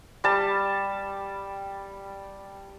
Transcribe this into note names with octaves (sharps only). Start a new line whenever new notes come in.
G3 A5